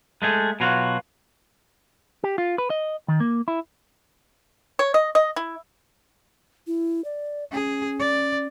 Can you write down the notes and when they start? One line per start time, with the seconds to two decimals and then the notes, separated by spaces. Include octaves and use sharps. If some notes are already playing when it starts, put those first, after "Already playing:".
0.22 G#3 A3 G#4
0.60 B2 F#3 F4 F#4
2.24 G4
2.38 F4
2.58 B4
2.70 D#5
3.08 D#3
3.20 A#3
3.48 E4
4.79 C#5
4.94 D#5
5.15 D#5
5.36 E4
6.67 E4
7.05 D5
7.52 C#4 G#4
7.99 D5